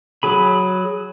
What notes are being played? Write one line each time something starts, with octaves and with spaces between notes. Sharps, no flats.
F#3 G#4 B5